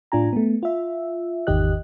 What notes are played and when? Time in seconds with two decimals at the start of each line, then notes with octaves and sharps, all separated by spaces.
0.12 A2 D4 F4 G#5 A#5
0.33 A3 B3
0.63 F4 E5
1.47 G#1 E2 D#3 G4 D#5 F#6